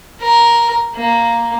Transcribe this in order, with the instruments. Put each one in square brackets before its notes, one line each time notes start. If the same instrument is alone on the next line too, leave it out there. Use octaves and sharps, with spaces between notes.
[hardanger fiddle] A#4
A#3